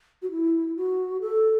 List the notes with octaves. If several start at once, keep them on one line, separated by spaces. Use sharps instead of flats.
F#4
E4
F#4
A4